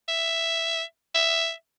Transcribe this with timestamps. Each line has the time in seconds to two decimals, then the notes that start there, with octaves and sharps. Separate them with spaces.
0.08 E5
1.15 E5